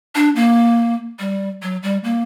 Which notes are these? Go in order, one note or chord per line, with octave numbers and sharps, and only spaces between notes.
D4
A#3
G3
F#3
G3
A#3